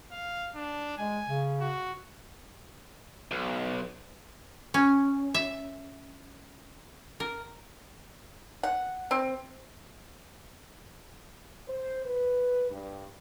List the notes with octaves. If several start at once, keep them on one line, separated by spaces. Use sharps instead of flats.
F5
D4
G#3 G#5
C#3
F#4
B1
C#4
E5
A#4
F#5
C4
C5
B4
G2